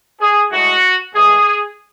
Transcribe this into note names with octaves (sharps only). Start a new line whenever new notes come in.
G#4
A2 G#3 F#4
A2 E3 G#3 G#4